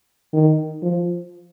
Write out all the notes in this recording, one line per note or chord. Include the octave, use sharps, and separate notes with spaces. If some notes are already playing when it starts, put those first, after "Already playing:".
D#3
F3